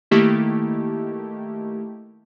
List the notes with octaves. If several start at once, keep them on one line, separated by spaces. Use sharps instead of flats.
D#3 A3 A#3 E4 G4